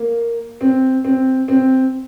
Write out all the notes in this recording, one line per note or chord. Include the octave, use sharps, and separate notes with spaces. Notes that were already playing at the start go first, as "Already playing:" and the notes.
Already playing: A#3
C4
C4
C4